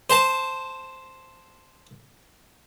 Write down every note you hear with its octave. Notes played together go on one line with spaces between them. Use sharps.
C5 A5